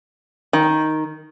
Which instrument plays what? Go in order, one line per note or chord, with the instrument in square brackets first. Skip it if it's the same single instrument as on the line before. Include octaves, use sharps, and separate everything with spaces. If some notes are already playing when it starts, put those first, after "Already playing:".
[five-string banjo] D#3